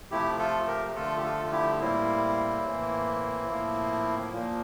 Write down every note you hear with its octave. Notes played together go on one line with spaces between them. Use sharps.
C3 F3 A3 E4 G4
F4 A4
G4 A#4
D3 F3 A3 F4 A4
G4
F4 A4
F4
E4 G4
A2 G3 A#3 C4 E4
A2 E3 A#3
A2 F3 A#3
A#2 F3 A#3